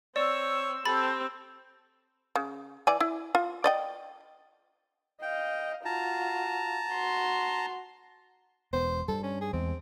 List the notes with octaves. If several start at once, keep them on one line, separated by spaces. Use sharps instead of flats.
C4 C#5 D5 E6
C4 G4 A4 B5 A6
C#3
E3 D5 G#5
E4
F4
D5 D#5 G5
D#5 F5 G5
F4 F#4 A5 A#5
F#4 C6
E1 B3 C5
G2 G3 A4
C#4
G#4
E2 G#3 C4